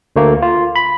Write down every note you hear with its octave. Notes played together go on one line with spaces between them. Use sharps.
D2 A3 A#3
F4
B5